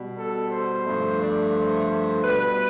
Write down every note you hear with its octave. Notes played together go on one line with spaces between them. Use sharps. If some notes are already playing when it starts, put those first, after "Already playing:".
Already playing: B2 G3
A4
C5
G2 F3 A3
D5
C5
B2 G3 B4